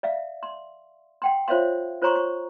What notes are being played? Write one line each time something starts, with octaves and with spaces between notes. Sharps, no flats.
D5 E5 F5
C6
F#5 G5 C6
F4 C5 C#5 E5 F5 C6
F4 C5 C#5 A#5 C6 C#6
C#6